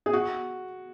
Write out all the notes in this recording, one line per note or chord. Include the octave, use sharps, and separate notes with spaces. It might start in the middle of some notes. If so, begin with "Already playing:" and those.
G#4
F#4